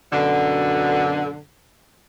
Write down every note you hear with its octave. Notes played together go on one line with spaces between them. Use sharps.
F#2 B2 D3